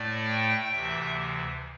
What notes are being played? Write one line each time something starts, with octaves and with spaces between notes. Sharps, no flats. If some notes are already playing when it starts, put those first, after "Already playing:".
Already playing: A2 A3 D5
G5
D2 C3 E3 E5